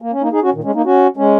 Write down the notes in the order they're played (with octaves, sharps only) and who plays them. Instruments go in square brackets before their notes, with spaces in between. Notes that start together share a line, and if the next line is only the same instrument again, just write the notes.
[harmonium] A#3
C#4
A#3 D#4
D#4 G#4
C#4 F#4
A#2 D#3
G#3 C#4
A#3 D#4
C#4 F#4
G#3 C#4